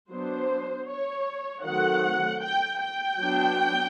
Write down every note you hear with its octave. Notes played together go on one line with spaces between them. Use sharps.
F#3 B3 D4 C5
C#5
D#3 F#3 A3 C4 F#5
G5
G5
F#3 B3 D4